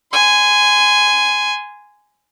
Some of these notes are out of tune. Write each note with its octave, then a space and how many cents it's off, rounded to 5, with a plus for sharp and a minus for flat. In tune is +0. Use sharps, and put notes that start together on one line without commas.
G#5 +0 C6 -30